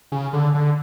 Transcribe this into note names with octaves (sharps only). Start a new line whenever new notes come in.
C#3
D3
D3